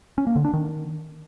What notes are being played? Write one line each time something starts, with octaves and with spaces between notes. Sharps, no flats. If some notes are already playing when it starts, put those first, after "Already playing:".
C#4
A#3
D3
D4
D#3